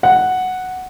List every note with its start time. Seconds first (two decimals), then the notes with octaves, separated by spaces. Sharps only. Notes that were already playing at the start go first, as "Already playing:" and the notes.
0.03 F#5